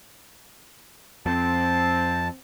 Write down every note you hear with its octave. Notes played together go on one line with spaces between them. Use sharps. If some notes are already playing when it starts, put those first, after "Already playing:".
F2 C4 A5